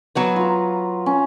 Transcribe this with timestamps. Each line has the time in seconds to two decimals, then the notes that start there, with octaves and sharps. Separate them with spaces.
0.15 F#3 B3 B4
0.36 F4 A#5
1.06 C#4